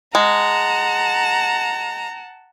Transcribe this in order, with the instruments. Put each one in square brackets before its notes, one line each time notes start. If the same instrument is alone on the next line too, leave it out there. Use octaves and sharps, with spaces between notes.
[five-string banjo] G#3 [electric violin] F#5 A5 [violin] A#5